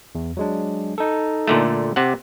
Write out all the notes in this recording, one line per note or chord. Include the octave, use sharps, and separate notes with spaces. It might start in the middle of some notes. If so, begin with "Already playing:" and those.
E2
F#3 G#3 D4
D#4 A4
A#2 D3 A3
C3 G4 F#5